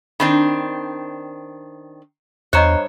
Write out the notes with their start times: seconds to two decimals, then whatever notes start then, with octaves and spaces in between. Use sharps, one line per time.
0.20 D#3 C4 D4 B5
2.53 E2 G2 C5 C#5 D#5 A#5 F#6